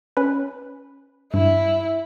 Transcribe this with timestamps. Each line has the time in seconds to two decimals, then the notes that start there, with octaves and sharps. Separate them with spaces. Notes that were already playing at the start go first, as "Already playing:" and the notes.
0.17 C#4 B4
1.34 G2 E4